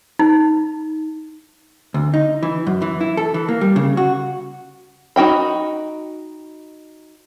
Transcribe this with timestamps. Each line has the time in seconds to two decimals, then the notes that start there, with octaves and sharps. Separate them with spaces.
0.19 D#4
1.94 D2
2.14 D#4
2.43 E3
2.67 F#2
2.82 E3
3.01 E4
3.17 A4
3.34 E3
3.49 A#3
3.61 G3
3.76 C#3
3.97 F#4
5.16 D#4 F#4 G5 B5